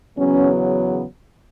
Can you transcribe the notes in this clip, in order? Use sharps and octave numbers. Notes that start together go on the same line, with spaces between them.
E2 C#3 F#3 B3 C#4